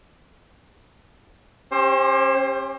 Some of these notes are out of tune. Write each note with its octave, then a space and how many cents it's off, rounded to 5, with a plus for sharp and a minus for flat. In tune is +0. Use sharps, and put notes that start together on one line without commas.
C#4 -30 G4 +20 C5 +25